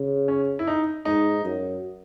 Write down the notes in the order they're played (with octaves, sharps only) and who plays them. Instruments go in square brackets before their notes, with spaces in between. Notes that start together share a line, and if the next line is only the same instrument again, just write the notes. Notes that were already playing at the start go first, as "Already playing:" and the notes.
Already playing: [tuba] C#3
[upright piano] C#4
E4
D#4
[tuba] G#2 [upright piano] D#4
[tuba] F#2